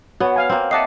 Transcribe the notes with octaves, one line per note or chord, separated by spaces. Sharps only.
B3 F#4 C#5
F5 G#5
A#3 C4
D#5 E5 F#5 A5 D6 C7